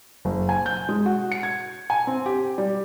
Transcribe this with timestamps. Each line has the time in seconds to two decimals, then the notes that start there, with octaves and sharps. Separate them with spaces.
0.25 F#1
0.49 G#5
0.66 G6
0.89 G#3
1.06 F#4
1.32 C#7
1.43 G#6
1.90 G#5
2.07 C4
2.26 G4
2.58 G3